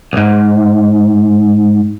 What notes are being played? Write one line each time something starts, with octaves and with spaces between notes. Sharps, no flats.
B1 G#2